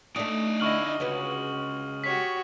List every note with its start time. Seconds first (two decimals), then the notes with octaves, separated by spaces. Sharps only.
0.16 A3 D4 D#4 D5 D#6
0.60 D3 E4 D#5 C#6 F6 F#7
1.00 C#2 C#4 F#4 B4
2.04 F#4 G4 C#5 B6